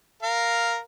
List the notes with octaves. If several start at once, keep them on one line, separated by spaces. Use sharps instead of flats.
A#4 F5